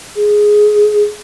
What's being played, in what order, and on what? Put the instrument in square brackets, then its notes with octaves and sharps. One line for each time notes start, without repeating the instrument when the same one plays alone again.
[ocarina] G#4